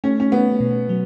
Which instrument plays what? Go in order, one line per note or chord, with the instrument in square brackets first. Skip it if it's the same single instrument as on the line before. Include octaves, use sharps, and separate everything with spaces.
[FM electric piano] A3 [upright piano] C#4
[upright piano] C#4
[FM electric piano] A3 [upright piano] B3
[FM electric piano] B2
F#3